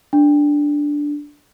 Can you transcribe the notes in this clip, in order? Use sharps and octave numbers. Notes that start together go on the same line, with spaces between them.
D4